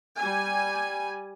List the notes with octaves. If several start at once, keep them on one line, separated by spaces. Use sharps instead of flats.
G3 G#5